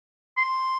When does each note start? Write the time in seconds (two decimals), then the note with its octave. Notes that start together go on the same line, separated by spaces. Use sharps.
0.37 C6